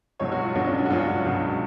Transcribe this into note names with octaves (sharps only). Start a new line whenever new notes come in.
C#2 B2 F#3 C#5
F#4
F4
C#2 B2 F#3 D4
C#4
D4
F#4
C#2 B2 F#3 F4
F#4
C#2 B2 F#3